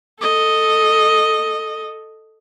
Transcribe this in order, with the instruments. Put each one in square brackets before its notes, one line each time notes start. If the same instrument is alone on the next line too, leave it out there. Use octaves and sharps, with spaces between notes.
[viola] A4 D#5